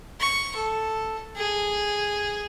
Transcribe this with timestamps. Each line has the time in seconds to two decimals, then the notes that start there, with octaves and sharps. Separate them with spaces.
0.20 C#6
0.55 A4
1.37 G#4